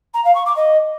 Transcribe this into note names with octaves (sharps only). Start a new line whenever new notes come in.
A#5
F5
C#6
D6
D#5